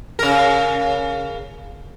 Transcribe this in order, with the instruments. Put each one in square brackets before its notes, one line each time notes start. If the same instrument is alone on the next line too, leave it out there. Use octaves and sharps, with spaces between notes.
[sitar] C#3 A#4